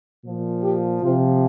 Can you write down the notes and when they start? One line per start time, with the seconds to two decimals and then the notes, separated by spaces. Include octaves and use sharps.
0.24 A#2 F3
0.63 G4
1.02 C3 F3 F4